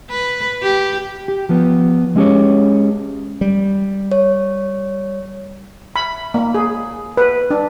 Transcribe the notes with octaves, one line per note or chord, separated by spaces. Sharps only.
B4
G4
G4
F3 B3
G#3 C#4 G4 G#4 C#5
G3
C#5
B5
A#3
G#4
B4
D4